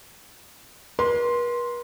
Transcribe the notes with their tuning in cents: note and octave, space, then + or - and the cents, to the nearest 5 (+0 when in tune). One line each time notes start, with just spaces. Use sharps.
B4 -45 C6 +0